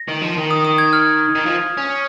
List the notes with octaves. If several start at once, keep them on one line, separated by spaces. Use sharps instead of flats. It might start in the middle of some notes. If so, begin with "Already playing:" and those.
Already playing: A#6
D#3
F3
D#3
D#6
D#6
G#6
F6
D#3
F3
C#4